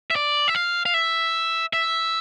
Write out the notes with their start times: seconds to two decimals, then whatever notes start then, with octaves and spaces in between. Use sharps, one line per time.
0.11 E5
0.16 D5
0.48 E5
0.55 F5
0.86 F5
0.94 E5
1.73 E5